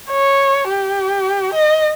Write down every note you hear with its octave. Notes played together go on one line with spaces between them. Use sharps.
C#5
G4
D#5